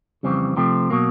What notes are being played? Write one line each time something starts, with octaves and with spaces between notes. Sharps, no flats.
F2 C#3 E3 G3 C4
C3 F3 A3 C4
B2 F#3 A#3